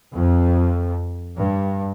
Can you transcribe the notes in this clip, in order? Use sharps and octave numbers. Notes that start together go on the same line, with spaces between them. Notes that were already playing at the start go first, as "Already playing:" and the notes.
F2
G2